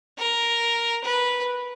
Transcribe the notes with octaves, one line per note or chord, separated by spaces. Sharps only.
A#4
B4